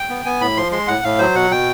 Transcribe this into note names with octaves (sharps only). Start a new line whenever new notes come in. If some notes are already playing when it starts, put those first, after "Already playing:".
Already playing: G5
B3
B3 G#5
A2 B5
F3 C6
G#3 C6
A2 F#5
A2 F5
F#3 C5
B2 F#5
B2 G5